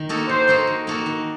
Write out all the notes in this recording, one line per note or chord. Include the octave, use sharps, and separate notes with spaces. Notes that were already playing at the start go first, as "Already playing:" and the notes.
Already playing: D#3
A#3 D#4 F#4 A4
D#3 C5
A#3 D#4 F#4 A4
D#3
A#3 D#4 F#4 A4
D#3